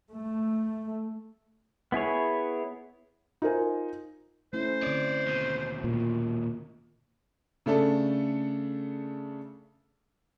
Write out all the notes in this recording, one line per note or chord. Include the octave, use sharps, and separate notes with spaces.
A3
B3 E4 G#4 C#5
D#4 F4 A#4 C5 G#5
A3 C#4 E4 C5
D3 C4 C#5 D5
D#2 B2
A#2
C#3 A3 D4 A4